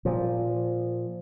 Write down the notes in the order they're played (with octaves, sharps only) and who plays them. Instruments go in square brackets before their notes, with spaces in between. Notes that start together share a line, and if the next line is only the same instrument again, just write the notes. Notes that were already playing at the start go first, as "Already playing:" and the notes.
[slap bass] A#2 F3